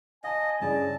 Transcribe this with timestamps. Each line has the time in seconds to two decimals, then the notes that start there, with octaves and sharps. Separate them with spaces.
0.24 D#5 F5 G#5 A5
0.61 G2 C#3 E4 D5 A5